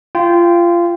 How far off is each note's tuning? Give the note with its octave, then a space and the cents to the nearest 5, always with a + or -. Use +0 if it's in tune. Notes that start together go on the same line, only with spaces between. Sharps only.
F4 -20 G5 +0